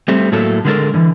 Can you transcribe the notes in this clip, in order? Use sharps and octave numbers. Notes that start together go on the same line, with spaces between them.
G3 A3 C4
A2 F#3 A3 A#3 A4
D3 G#3 A3 B3 A4 A#4
D3 E3